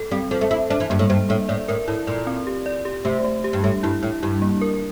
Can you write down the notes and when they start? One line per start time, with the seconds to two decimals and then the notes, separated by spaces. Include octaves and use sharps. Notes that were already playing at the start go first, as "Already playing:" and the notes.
Already playing: A4
0.11 G3 C4
0.31 F3 A4
0.41 A3
0.51 E4 A4
0.70 D4 C5
0.80 E3
0.90 G2 A#3
0.99 A2
1.10 G2 C5
1.29 A2 A#3
1.49 A2 D5
1.68 A2 A#4
1.88 A2 E4
2.07 A#2 D5
2.27 C4
2.47 G4
2.66 D5
2.85 G4
3.05 C3 A3
3.24 A3
3.44 G4
3.53 G2
3.64 A2 G4
3.83 G2 E4
4.03 A2 E4
4.23 G2 E4
4.42 A#3
4.61 A#4